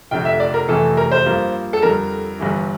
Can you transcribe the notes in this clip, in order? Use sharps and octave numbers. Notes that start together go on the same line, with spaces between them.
F1 F2 D3 G5
E5
D5
A#4
F1 F2 C3 E3 A3 A4
A#4
C5
G2 F3 A#3
A4
F2 D3 G3 A#4
G1 G2 E3